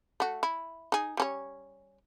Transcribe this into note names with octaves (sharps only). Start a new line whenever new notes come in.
A3 F#4
E4
D#4 G#4
G3 C#4 C#5